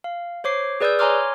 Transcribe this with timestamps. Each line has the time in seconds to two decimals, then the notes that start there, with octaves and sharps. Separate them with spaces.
0.04 F5
0.44 C5 C#5 D6 C7
0.81 G#4 B4 D5 D#6 E6 G6
0.99 C#5 G#5 A#5 C6 D6 F6